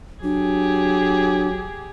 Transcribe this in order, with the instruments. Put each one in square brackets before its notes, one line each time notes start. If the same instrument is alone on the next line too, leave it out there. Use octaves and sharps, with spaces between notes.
[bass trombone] F#3 [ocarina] D4 [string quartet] G4 G#4